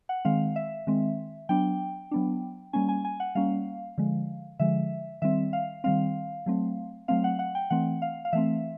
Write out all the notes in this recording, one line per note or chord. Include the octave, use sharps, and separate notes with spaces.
F#5
D#3 G#3 C4 F5
E5
D#3 G#3 C4
F#3 B3 D4 G5
F#3 B3 D4
G3 A#3 C#4 G#5
G#5
G#5
F#5
G3 A#3 C#4 F5
D3 F3 G#3
D3 F3 G#3 E5
D#3 G3 C4 E5
F5
D#3 G3 C4 F5
F#3 A3 C4
F#3 A3 C4 F5
F#5
F#5
G5
E3 A3 C4 F#5
F5
F5
E3 A3 C4 E5